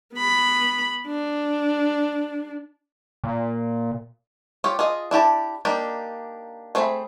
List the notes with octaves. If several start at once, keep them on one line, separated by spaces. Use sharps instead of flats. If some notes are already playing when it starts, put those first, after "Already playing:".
B3 B5
D4
A#2
F4 G4 C#5
F4 G#4 D#5
D4 E4 G4 A5
A#3 D4 D#4 G4
A3 C4 G#4 E5 B5